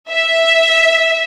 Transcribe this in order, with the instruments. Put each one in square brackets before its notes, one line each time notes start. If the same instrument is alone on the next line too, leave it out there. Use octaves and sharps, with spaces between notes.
[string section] E5